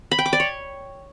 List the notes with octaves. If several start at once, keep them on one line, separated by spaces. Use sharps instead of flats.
B5
G5
D6
D5
C#5